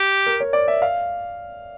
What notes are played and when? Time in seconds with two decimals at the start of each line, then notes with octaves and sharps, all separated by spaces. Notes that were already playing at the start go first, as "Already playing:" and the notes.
Already playing: G4
0.26 A#4
0.40 C#5
0.53 D5
0.68 E5
0.82 F5